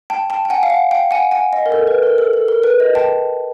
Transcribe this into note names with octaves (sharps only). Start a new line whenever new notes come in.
G5 A5
G5 A5
G5
F#5 G#5
F5
F#5
F5 G5
F#5 G#5
F#5 G#5
D#5
A#4
A4
B4
A#4
A4
A4
A#4
B4
D#5
G5 A5